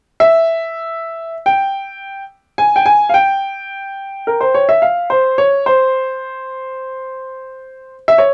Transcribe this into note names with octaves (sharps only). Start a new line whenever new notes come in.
E5
G5
G#5
G5
G#5
F5
G5
A#4
C5
C#5
E5
F5
C5
C#5
C5
E5
C#5